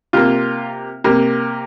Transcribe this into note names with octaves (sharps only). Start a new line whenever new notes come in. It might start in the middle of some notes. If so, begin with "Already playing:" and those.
C3 A#3 F4
C3 A#3